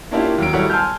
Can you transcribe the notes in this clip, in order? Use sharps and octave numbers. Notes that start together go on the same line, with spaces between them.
A#3 C#4 D4 E4 F4 G4
D#2 F#3 D7
F#3 G3 A3 E4 C#5 F#5
G#5 A5 C6 E6 F6 G6